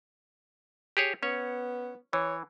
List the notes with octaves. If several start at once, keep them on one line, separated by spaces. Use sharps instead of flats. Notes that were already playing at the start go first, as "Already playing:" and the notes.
G4 G#4 C#5
B3 C#4 C#5
E3 C#5